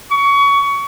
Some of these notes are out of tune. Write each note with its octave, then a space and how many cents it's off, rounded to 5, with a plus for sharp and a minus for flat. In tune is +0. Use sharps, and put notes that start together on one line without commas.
C#6 +25